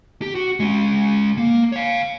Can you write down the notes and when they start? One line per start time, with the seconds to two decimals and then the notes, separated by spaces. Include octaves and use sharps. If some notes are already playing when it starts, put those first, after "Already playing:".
0.22 G4
0.35 F#4
0.60 G#3 C#4
1.38 A#3
1.72 C#5 F5